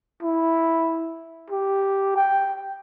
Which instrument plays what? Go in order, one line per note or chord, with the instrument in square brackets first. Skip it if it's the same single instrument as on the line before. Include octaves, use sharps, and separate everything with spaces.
[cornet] E4
G4
G5